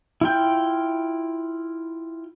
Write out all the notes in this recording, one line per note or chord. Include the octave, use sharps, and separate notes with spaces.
E4 F4 G5